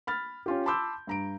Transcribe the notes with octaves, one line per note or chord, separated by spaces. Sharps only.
B5 F6 A6
C#4 F4 G4
A5 B5 C6 D6 E6 G6
G2 A#5 D7